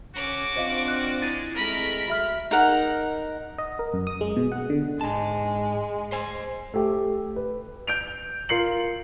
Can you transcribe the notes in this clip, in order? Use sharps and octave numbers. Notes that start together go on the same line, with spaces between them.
C#3 C#4 F#4 D6 D7
C4 D4 F4 C5 D#5 F5
F#6
G#3 E4 A6 D#7
G#3 A3 C4 A#4 B5 B6
F#4 E5 F6
D#4 A#4 F#5
D#5
A#4
F#2
D#6
G#3
B2
F#5
D3
G#2 G#3 A5
C5 G#5
A3 G4
B4
G6 D7 F7
F4 A#4 C7 C#7 F#7